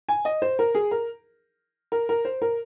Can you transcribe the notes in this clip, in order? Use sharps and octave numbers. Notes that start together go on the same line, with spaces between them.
G#5
D#5
C5
A#4
G#4
A#4
A#4
A#4
C5
A#4